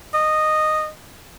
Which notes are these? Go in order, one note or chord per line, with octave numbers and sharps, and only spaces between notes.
D#5